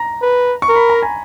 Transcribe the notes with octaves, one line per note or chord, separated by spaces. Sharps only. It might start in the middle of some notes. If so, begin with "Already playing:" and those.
Already playing: A#5
B4
C#6
A#4
B5
A#5
G#5